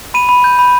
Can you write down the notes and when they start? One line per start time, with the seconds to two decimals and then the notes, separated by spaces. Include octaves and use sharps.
0.14 B5 D#7
0.29 B5
0.44 G6
0.59 B5